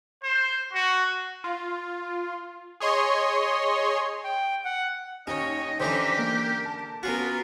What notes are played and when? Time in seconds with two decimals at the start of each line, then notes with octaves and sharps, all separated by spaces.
0.24 C5
0.73 F#4
1.44 F4
2.80 G#4 C#5 D#5 C6
4.24 G5
4.65 F#5
5.27 D#2 C#4 C#5 D#5
5.80 D3 E3 C#4 D#4 G4 C5 A#5 D6
6.18 A#3 A#4
6.66 A5
7.03 B3 C#4 F4 F#4 A#4 B4